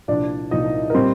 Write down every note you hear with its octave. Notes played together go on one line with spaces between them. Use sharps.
C2 A#2 F3 D4 D5
C2 A#2 F3 D#4 D#5
A#4
A#2 G3 C4 C5